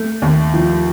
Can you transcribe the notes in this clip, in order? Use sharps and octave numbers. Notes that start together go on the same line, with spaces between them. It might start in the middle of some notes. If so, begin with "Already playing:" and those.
Already playing: A3
D#2
F3